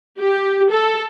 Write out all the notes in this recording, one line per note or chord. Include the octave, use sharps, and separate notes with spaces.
G4
A4